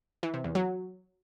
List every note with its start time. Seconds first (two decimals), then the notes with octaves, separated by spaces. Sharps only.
0.23 E3
0.34 C3
0.44 E2
0.55 F#3